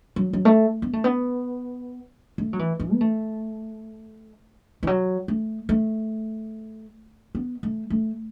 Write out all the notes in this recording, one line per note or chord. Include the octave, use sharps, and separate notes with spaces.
F#3
F#3
A3
B3
A3
B3
A3
F#3
E3
E3
B3
A3
E3
F#3
A3
A3
B3
A3
A3